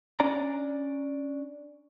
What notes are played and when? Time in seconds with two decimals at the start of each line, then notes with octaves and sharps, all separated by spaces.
0.20 C#4 D4 D5 A#5